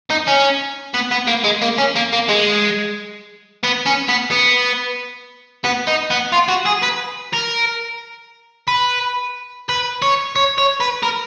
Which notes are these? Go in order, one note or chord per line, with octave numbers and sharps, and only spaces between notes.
D#4
C#4
B3
B3
A#3
G#3
A#3
C#4
A#3
A#3
G#3
B3
C#4
B3
B3
B3
D#4
B3
F4
F#4
G#4
B4
A#4
B4
B4
C#5
C#5
C#5
B4
A#4